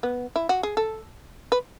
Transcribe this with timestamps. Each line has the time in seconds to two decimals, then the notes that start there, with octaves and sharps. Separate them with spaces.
0.03 B3
0.36 E4
0.49 F#4
0.63 G#4
0.77 A4
1.52 B4